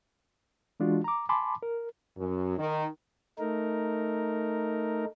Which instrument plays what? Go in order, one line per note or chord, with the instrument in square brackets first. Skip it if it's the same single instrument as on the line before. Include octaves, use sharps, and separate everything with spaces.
[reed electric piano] E3 G#3 D4 F4 F#4
A#5 D6
G#5 A5 B5 C6 D6
A#4
[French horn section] F#2
D#3
[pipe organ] A3 D#4 A#4